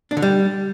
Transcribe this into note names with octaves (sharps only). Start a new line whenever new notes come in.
D4
D3
G3